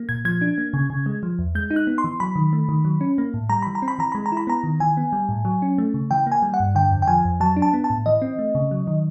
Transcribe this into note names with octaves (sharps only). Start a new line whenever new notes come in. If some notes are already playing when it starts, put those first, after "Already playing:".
Already playing: A#3
A#2 G#6
F3 G#6
D4
A#3
C#3
C#3
G#3
F3
E2
G#3 G6
D#4
F#6
B3
C6
E3
F#3 B5
D#3
A3
D#3
F#3
C#4
A#3
A2
G3 A#5
E3 B5
A#5
C4
B5
E3 A#5
G#3 B5
A#5
E4 B5
B3 A#5
D#3
E3 G#5
B3
G3
A2
F#3
C#4
A3
C#3
E3 G5
A#3 G#5
G3
F#5
G2
D3 G5
F2
G5
F3 G#5
F2
F#3 A5
D4
A5
B3
A5
A2
E3 D#5
C4
A3
C#3
F#3
D#3